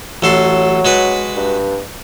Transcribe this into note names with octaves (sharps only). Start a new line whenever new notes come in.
A1 F#3 A4 C6
G#3 F#4 B4
G2